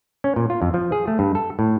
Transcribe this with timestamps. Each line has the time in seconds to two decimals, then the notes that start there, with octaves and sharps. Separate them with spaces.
0.24 C#4
0.36 A#2
0.50 F4
0.62 F2
0.74 F3
0.92 G#4
1.08 A3
1.19 G2
1.35 A4
1.59 A2